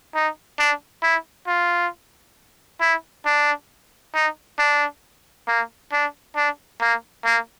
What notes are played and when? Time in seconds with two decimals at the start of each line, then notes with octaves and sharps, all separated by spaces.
0.15 D#4
0.59 D4
1.03 E4
1.47 F4
2.81 E4
3.25 D4
4.14 D#4
4.58 D4
5.48 A#3
5.92 D4
6.36 D4
6.80 A#3
7.25 A#3